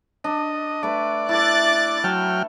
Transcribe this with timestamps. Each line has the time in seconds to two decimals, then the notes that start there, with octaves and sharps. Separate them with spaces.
0.24 D4 D#5
0.83 A3 B4 D5
1.29 E4 A4 D6 F#6 A6
2.04 F#3 G5 A5 F6